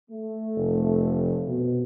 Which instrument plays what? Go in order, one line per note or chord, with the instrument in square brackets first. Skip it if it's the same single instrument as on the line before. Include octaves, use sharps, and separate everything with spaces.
[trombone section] A3
[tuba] F1
B2